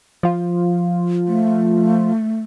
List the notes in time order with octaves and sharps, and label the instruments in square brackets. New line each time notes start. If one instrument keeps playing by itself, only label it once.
[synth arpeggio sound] F3 F4
[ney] A3